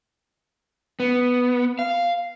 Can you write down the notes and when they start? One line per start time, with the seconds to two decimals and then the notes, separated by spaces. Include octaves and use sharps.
1.00 B3
1.79 F5